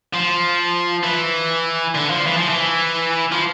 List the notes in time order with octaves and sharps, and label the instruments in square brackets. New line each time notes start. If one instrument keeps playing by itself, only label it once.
[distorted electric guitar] F3
E3
D3
F3
E3
F3
E3
F3